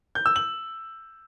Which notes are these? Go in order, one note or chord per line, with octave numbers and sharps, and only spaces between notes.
G6
E6
F#7